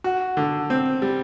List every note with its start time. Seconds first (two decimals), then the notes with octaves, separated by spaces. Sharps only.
0.04 F#4
0.37 D3
0.70 C4
1.02 G3